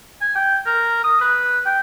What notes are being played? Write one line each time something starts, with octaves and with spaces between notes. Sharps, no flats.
G#5
G5
A#4
D#6
B4
G5